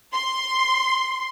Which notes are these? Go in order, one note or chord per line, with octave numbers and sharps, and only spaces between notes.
C6